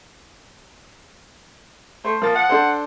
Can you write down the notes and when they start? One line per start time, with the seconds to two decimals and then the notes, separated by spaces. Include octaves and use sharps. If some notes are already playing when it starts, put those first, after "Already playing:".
2.05 A3 C5
2.22 F3 A#3 A6
2.35 F#5
2.49 D4 A4 C5